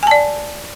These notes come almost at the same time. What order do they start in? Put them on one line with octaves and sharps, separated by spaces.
G#5 A5 D5